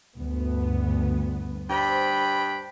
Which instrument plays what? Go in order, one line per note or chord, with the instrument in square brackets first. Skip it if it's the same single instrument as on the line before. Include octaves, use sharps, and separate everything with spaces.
[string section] D2 G2 B3
[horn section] G2 G5 B5 [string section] C5